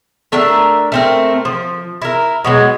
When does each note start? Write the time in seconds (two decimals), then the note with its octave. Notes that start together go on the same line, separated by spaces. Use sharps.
0.32 A3 D4 A#4 E5
0.92 A3 C4 A#4
1.45 F3
2.02 E4 A#4
2.44 B2 F#3 G#3